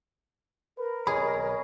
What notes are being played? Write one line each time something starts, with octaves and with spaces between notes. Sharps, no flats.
A#4 B4
B1 G#4 C#5 D#5 B5